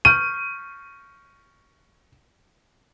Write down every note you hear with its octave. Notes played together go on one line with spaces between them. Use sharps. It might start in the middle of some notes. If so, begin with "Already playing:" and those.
C#6 F6 G6 D#7